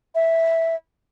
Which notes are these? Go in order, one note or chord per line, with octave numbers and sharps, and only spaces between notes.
E5